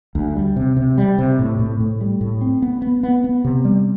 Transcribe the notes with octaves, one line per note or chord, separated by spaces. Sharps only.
D2
G3
C3
C3
G3
C3
A2
A2
A2
G3
A2
C4
B3
B3
B3
B3
C3
G3